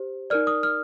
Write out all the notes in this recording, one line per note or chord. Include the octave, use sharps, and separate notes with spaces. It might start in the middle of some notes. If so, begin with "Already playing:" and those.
Already playing: G4 C5
D#4 A#4 D5 F6
D#6
F6